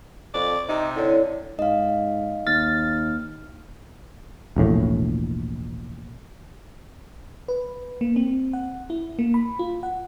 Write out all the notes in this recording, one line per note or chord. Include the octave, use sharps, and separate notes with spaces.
F2 D5
C3 D#4
D3 E4 C#5
G#2 D#5 F5
D#2 F6 A6
E1 A#1 A2
B4
A#3
C4
F#5
E4
A#3
B5
F4
F#5